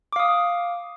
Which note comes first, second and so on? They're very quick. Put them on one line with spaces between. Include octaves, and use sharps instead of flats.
D6 F5 D#6